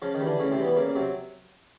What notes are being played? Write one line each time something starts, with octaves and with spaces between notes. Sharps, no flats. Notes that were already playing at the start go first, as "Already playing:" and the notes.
C#3 F3 F4
D#3 D#4
E3 G3
D3 D4
A2 C#3 C#4
C3 C4
E3 G3
B2 B3
A#2 C#3 A#3
C3 F#3 C4